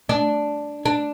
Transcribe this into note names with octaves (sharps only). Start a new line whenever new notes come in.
D4
D4